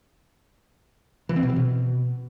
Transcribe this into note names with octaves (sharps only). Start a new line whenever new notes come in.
E3
C4
B2
E3
B2